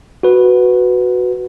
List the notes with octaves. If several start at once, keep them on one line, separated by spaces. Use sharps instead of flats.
F#4 B4